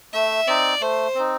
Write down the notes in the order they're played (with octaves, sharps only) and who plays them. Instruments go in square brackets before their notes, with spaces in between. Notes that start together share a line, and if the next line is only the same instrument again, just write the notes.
[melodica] A3 [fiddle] E5
[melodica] C4 D#4 [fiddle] D5
[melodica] A3 [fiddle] C5
[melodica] C4 D#4